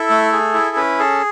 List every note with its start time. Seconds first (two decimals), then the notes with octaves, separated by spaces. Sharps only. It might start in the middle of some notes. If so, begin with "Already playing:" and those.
Already playing: E4 A4
0.10 A3
0.32 G#4
0.54 E4
0.76 C#4 B4
0.99 G#4 A4